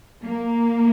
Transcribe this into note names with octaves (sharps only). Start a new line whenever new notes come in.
A#3